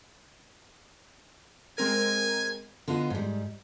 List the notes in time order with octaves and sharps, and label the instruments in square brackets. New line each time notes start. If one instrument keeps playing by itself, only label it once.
[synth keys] G#3 C4 A#4 [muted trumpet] G#5
[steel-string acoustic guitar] D3 B3 F4 D#5
G#2 G3